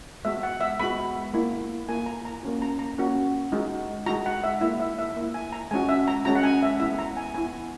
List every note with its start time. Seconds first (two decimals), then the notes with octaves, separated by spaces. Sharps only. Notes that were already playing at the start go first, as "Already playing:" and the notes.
0.25 G#3 B3 F#4 E5
0.43 F#5
0.61 E5
0.80 G#3 B3 F#4 B5
1.34 A#3 E4
1.89 A#3 E4 G#5
2.06 A#5
2.25 A#5
2.43 A#3 C#4 F#4
2.62 A#5
2.79 A#5
2.98 A#3 C#4 F#4
3.52 G#3 D#4 F#4
4.06 G#3 D#4 F#4 A#5
4.26 F#5
4.44 E5
4.61 A#3 E4 E5
4.80 E5
4.99 E5
5.17 A#3 E4
5.34 G#5
5.53 A#5
5.71 G#3 C#4 F#4 G#5
5.89 E5
6.08 A#5
6.25 G#3 C#4 F#4 A#5
6.35 F#5
6.43 G#5
6.63 E5
6.80 B3 E4 E5
6.99 A#5
7.17 G#5
7.34 B3 E4 G#5